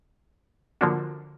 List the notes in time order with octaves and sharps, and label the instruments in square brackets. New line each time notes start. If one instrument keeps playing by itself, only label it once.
[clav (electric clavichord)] D3 F3 A#3 D4 F#4